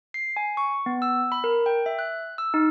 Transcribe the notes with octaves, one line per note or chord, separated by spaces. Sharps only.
C7
G#5
C#6
B3
E6
B5
A#4
G5
E5
F#6
E6
D#4